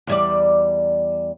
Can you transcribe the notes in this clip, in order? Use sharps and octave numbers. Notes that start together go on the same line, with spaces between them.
E2 G3 D5